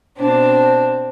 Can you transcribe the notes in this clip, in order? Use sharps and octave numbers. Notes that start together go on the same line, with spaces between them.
B2 C4 D4